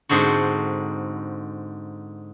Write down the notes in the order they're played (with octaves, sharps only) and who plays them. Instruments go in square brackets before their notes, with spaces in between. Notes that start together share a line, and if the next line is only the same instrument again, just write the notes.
[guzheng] G#2 D3 C4 F#4